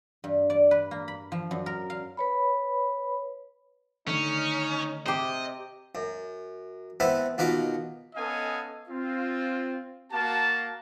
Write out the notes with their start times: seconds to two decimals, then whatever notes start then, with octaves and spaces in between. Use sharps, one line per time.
0.24 G2
0.50 D5
0.71 B4
0.91 A#3
1.08 B5
1.32 F3
1.51 F#2
1.66 A#4
1.90 F5
2.17 B4 C#5 B5
4.07 D3 D#3 A3 C#4 D#4
5.06 C3 G4 C5 D#5
5.95 F#2
7.00 B3 C4 E4 A4 B4
7.38 D#2 B2 F4 F#4 B5 D6
8.15 B3 C#4 A4 D#5 F5 G#5
8.89 C4 F4
10.12 A#3 F#4 F5 A5